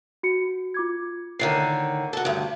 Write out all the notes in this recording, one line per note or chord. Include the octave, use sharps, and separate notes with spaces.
F#4 C#7
F4 D6 G#6
A2 D3 D#3 C7
F#4 A4
D2 G2